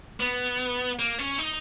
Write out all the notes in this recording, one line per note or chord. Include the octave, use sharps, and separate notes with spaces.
B3
A#3
C#4
D#4